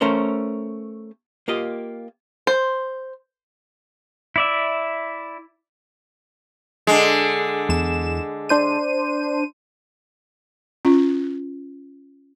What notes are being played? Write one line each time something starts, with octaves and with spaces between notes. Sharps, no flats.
A3 C#4 A#4 C5
A#3 F4 G4 D#5
C5
E4 D5 E5
D3 G#3
E2 E7
D4 C5 D#7
C#4 F4